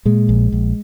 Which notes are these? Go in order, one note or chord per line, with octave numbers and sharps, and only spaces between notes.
A#2 G#3
A#1
A#1